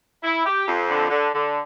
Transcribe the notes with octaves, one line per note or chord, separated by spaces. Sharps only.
E4
G4
F2
D3
D3
D3